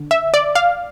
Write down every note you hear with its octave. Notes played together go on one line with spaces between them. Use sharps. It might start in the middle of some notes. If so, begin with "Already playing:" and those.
Already playing: D3
E5
D5
F5